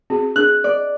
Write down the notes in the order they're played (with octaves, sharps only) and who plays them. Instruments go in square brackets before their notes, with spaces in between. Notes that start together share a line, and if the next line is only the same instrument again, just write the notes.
[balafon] C4 F#4 G#4
[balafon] D4 G#4 [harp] F#6
[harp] D5